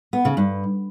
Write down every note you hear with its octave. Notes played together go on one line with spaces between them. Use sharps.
B3
C#3
G2